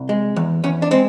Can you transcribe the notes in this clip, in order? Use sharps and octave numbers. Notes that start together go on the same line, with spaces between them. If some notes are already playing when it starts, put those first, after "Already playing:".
Already playing: C2
G#3
E2
E2 C#4
D4
G#3 C4